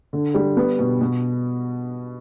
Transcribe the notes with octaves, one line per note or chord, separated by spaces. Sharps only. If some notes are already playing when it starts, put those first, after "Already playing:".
D3
G3
B3
B2
B2